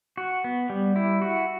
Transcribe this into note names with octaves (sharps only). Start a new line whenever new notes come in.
F#4
B3
G3
E4
F#4